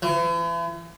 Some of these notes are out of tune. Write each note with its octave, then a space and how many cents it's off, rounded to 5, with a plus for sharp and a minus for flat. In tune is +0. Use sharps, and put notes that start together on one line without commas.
E3 +40